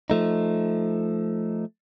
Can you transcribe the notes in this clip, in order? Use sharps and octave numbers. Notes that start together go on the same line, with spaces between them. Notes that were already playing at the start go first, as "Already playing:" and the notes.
F3 A3 D#4